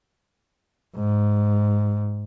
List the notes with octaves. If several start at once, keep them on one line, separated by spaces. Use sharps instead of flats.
G#2